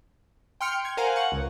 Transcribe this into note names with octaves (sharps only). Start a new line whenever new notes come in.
G5 C6 F6 C#7
G#6
A#4 C5 F5 F#5 G#5 A#5
F#5 C#6
C#2